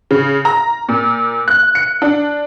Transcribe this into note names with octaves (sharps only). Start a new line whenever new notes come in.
C#3
A#5
A#2
F#6
C#7
D4